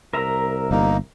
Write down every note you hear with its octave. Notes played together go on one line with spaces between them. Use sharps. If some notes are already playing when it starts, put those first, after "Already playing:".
C2 A#4 E5 A#5
G1 A#3 D#4